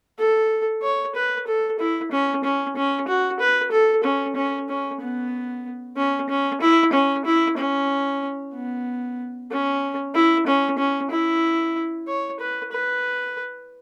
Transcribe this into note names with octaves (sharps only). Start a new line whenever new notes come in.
A4
C#5
B4
A4
E4
C#4
C#4
C#4
F#4
B4
A4
C#4
C#4
C#4
B3
C#4
C#4
E4
C#4
E4
C#4
B3
C#4
E4
C#4
C#4
E4
C#5
B4
B4